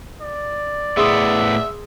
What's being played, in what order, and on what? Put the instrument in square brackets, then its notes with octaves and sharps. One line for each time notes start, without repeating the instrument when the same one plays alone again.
[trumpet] D5
[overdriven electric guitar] A2 B3 [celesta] G#4 C6 D#6 [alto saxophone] E5